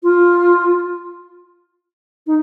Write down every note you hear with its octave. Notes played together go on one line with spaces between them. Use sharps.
F4
D#4